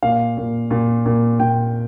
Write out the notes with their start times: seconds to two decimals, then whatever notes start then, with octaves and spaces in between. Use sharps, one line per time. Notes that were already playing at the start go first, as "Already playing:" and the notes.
0.03 A#2 F5
0.37 A#2
0.71 A#2
1.06 A#2
1.39 A#2 G5